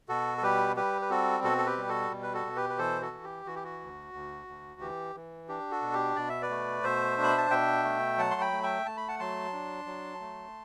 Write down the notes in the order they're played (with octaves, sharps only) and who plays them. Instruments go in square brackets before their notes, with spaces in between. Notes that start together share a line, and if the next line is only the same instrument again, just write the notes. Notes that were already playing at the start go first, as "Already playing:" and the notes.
[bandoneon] B2 F#4 A4
A4
G3 G4 B4
G3 G4 B4
B4
C4 F#4 A4
B2 F#4 A4
A4
G4 B4
G3
F#4 A4
B2
B4
F#4 A4
B2
G4 B4
B4
E3 A4 C5
F#4 A4
E3
G4
E3 F#4
G4
F#4
D2
D2
D2
E3 G4
E3
D4 G4
F#4 A4
B2
G4
B2 D5
E5
B4 D5
A3
B2 C5 E5
D4
B5
A5
B2 E5 G5
A3
F#3 F#5 A5
C6
G5 B5
A3
E5 G5
A3 A5
B5
F#5 A5
F#3 A5 C6
D4
F#3
A3